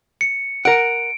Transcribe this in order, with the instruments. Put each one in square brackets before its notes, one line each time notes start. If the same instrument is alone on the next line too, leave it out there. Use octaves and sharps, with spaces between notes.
[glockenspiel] C#7
[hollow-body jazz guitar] A#4 F#5 [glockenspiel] D7